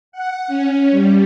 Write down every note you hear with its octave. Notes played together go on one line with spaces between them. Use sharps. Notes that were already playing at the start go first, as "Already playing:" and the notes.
F#5
C#4
G3